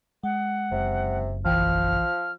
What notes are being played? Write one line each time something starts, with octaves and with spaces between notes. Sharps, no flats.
G#3 F#5
F#1 C3
A#1 E3 F3 G5 F6